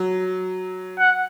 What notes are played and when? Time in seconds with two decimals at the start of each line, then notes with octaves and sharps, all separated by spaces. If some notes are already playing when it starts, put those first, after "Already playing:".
Already playing: F#3
0.99 F#5